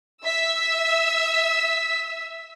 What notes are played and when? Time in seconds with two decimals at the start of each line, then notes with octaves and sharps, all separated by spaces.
0.25 E5 E6 B6